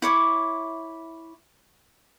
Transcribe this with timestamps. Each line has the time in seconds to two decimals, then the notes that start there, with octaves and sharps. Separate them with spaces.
0.02 E4 C#5 D6